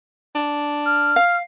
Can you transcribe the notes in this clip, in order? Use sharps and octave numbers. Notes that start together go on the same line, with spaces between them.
D4
F6
F5